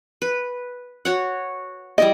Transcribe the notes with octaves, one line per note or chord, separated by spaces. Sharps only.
B4
F#4 C#5 F#5
G3 E4 D5 D#5